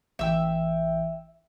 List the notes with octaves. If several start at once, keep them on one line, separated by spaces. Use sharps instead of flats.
A1 E3 E5 G5 E6